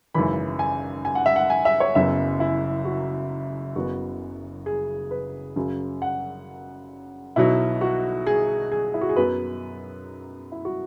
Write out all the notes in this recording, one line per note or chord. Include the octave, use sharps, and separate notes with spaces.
G#1 F#2 C#3 E3 B5
G#5
G#5
F#5
E5
F#5
G#5
E5
C#5
F#1 F#2 C#3 F#3 B3 E5
E4
F#4
F#1 F#2 C#3 F#3 B3 F#4
G#4
B4
F#2 C#3 F#3
F#5
B1 B2 F#3 E4
F#4
G#4
G#4
E4
F#4
G#4
F#2 F#3 B3 B4
E4
F#4